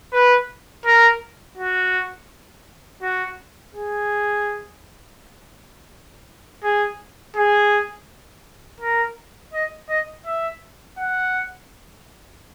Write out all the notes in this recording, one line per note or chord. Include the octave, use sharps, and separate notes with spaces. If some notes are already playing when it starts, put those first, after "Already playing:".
B4
A#4
F#4
F#4
G#4
G#4
G#4
A#4
D#5
D#5
E5
F#5